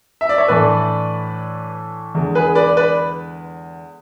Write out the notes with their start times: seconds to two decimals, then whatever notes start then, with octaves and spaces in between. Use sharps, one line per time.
0.21 E5
0.29 D5
0.38 C#5 E5
0.48 A2 E3 A3 D4 B4 D5
2.15 E2 D3 G#3
2.35 G#4 B4
2.55 B4 D5
2.77 B4 D5